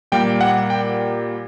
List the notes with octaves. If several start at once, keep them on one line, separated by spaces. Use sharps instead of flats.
A#2 G3 A#3 G5
F#5
G5